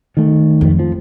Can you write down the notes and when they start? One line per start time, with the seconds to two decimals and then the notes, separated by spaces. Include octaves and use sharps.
0.17 D#3 A3
0.61 F2
0.79 F3